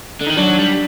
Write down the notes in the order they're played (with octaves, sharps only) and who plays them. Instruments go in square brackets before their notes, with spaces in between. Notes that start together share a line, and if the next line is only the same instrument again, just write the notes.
[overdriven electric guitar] D3
[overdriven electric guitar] D#3 [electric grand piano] D#4
[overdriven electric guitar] F#3 [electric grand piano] D4
[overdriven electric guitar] G3